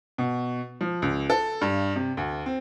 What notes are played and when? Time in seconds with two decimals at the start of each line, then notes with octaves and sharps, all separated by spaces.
0.18 B2
0.81 F3
1.02 C#2
1.30 A4
1.61 G2
1.96 C3
2.17 D2
2.46 C4